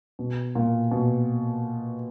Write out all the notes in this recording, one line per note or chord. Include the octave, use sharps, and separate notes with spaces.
B2
A#2
B2